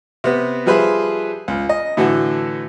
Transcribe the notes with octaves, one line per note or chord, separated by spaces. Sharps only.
C3 B3
F3 G3 G#4 B4 C5 E5
C#2
D#5
A2 D3 E3 F#4